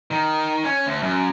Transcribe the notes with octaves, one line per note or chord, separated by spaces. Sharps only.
D#3
C#4
D2
F#2